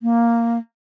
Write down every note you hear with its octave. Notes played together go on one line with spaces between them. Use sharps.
A#3